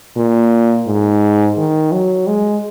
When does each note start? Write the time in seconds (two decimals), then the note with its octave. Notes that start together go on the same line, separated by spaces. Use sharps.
0.16 A#2
0.87 G#2
1.57 D#3
1.92 F#3
2.27 G#3